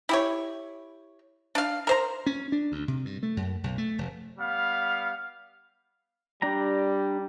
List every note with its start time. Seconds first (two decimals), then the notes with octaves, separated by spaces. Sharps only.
0.09 E4 G4 C#5
1.55 D4 F5
1.87 A#4 C5 A#5
2.26 C#4
2.52 D4
2.72 D2
2.88 C3
3.05 G2
3.23 A3
3.37 F#2
3.64 B1
3.78 A3
3.98 F1
4.39 G3 B3 F5
6.42 G3 D4 G4 A#5